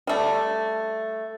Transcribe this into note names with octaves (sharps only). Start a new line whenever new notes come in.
G3 A3